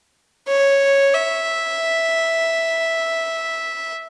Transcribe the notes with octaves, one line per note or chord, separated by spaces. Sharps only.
C#5
E5